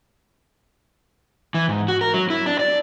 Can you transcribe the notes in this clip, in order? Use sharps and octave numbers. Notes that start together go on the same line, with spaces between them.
E3
G#2
F#4
A#4
F#3
E4
D4
D5